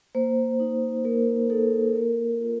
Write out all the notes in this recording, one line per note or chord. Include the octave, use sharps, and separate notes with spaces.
A#3 C5
D#4
A#3 A#4
D#4 A4
A#3 A#4
F4